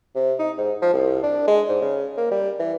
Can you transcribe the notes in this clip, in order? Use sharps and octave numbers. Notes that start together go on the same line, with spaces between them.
C3
D#4
G#2
F3
C2
D4
G#3
G#2
C#3
A#3
G3
E3